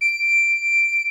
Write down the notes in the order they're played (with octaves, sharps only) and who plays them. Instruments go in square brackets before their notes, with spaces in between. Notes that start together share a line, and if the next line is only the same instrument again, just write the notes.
[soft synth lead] D7